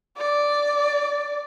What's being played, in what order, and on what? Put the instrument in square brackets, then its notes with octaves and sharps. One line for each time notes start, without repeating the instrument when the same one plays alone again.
[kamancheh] D5